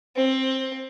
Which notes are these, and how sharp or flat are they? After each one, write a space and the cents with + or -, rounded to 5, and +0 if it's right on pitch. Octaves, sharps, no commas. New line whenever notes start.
C4 +15